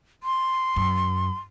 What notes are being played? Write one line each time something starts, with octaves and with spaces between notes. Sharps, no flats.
C6
F#2